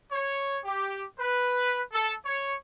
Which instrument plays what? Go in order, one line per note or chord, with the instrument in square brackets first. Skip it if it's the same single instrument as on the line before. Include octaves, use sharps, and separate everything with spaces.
[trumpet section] C#5
G4
B4
A4
C#5